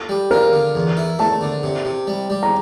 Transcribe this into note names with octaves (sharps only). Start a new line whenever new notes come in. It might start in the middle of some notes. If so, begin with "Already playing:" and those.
Already playing: A4
G3
F4 A#4
D3
E2
E4
A3 A5
D3
C3
C3
G3
G3
A#5